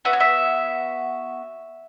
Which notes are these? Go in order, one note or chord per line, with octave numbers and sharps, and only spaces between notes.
B3 F#4 E5
C#5
E5